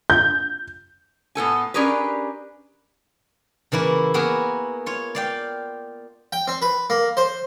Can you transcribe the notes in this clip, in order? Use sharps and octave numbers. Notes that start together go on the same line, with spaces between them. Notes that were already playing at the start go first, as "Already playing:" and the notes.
G6
A2 B3 A4 G#5
C#4 D4 G4 G#4 A#4 B4
C#3 E3 A#3 E4
A#3 B3 F#4 G#4 A#4
F4 C#5
D5 F5 G5
G5
C4
B4
A#3
C5